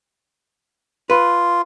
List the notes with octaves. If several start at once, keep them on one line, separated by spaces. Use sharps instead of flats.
F4 B4